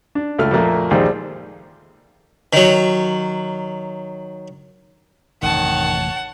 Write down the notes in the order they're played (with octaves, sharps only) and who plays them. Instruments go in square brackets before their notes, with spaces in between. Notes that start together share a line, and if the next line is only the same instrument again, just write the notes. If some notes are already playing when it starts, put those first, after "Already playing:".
[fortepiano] D4
C#2 A3 F6
F2 A#2 A3 A#3
A#1 D#2 D#4 G4 G#4 C5
[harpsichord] D#3 F#3
[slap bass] A1 F2 C3 [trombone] D#3 [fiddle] C#5 A5 [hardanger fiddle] F#5